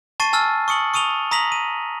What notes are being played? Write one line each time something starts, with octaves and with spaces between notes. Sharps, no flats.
A5 C#6 A6 C7 D#7
G#5 A5 E6 F6 A6
C#6 D#6 C#7 F#7
C#6 D#6 D#7 F7 G7
A#5 D#6 A#6 B6 F7 F#7
D#7